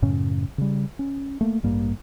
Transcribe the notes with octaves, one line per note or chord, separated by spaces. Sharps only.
F#2 A2 C#3 C#4
C#3 G3
C#4
A3 A#3
A1 G2 G3 A#3